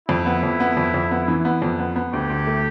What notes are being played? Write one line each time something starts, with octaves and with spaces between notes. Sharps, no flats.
F2 E4
B3
F2
B3
F2
F2
B3
E3
B3
F2
B3
B3
D2 G4
D2
A3